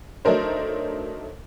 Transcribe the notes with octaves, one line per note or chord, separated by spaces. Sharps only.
F#3 A3 D4 D#4 A#4 C5